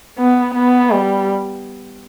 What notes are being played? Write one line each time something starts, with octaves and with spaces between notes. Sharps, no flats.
B3
B3
G3